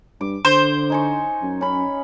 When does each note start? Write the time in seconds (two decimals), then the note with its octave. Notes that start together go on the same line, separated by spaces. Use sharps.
0.21 G2 D6
0.45 D3 C5
0.90 D#4 G#5 C#6
1.42 F#2
1.61 C#4 B5